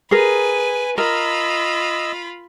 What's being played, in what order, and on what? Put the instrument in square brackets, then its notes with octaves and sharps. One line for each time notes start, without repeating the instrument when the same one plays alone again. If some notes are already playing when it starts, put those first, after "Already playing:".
[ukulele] G#4 A#4 [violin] B4 G#5
[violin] F4 B5 [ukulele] A#4 [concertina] D#5 E6